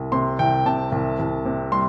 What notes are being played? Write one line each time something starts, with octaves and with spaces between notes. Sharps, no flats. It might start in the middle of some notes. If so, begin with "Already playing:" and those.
Already playing: C2
C3 C6
C2 G5
C3 A5
C2
C2
C3
G3 C6